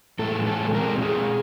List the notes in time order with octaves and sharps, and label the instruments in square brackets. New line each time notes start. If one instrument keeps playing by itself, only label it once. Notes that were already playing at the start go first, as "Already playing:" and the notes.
[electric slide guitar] A2 E3 G#3 A4
A4
B2 G#3 C4 A#4
G#4